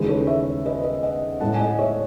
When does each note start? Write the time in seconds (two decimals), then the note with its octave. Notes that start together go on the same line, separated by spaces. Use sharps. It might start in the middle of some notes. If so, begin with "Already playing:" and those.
Already playing: D#2 C#3 E3 G#3 G#4 B4
0.08 A4 C#5
0.27 C#5 E5
0.66 B4 D#5
0.84 B4 D#5
1.03 D#5 F#5
1.40 A2 G#3 F#5 A5
1.55 G#5
1.60 D#5 F#5
1.79 C#5 E5